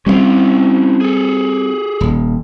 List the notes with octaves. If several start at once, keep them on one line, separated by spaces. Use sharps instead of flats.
G3 A3 C4 C#4 E4 F5
G#4 A4
D#1